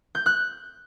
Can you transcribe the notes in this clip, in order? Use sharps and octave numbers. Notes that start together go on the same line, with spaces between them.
G6
F#6